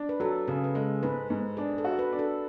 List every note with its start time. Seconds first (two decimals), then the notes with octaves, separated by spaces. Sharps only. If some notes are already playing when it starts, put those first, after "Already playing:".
Already playing: D4
0.09 B4
0.20 F#3 A4
0.48 C#3 G#4
0.64 B4
0.75 G#3 A4
1.03 G#2 B4
1.30 G#2
1.57 D4 G#4
1.78 A4
1.84 F#4
1.99 B4
2.13 D4
2.19 A4